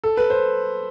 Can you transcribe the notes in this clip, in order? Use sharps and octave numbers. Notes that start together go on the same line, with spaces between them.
A4
B4
C5